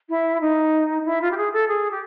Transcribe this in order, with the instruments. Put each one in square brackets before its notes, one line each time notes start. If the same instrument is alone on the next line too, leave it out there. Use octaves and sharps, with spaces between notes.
[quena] E4
D#4
E4
F4
G4
G#4
A4
G#4
G4